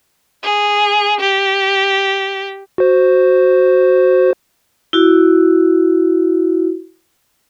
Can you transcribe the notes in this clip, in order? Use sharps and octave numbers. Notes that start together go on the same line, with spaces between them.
G#4
G4
F#4 C5
E4 F#4